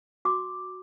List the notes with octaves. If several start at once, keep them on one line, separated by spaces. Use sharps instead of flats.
F#4 D6